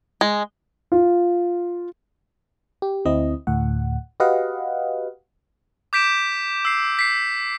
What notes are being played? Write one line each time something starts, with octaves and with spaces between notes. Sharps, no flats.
G#3
F4
G4
D2 C4 E4 D#5
D2 A2 F#5
F#4 G4 B4 D#5 F5 F#5
D6 G6 B6 D7 E7
E6 C7
B6 C7